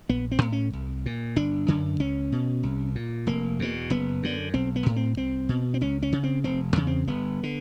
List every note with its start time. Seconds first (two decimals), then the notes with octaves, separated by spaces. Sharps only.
0.09 A#1 B3
0.32 C4
0.42 A2
0.52 C#4
0.73 C2
1.06 A#2
1.36 G1 D4
1.68 F#2 D3
2.00 C#2 C#4
2.32 B2
2.63 C2
2.95 A#2
3.27 F1 A#3
3.59 E2 B2
3.90 F#1 B3
4.23 F#2 D3
4.54 B1 C4
4.76 B3
4.86 A2
4.96 C4
5.17 C2 C4
5.49 B2
5.74 C4
5.81 C#2 C#4
6.03 C#4
6.12 C#3
6.24 C4
6.44 F1 C4
6.76 E2 C#3
6.87 C4
7.08 G1 B3
7.43 D3